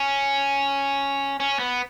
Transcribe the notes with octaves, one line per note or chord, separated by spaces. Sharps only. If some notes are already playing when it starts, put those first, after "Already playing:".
Already playing: C#4
C#4
B3